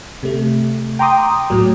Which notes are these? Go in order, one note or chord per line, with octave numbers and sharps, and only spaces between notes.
C3 A3
G5 A#5 C6 D6 D#6
A2 F#3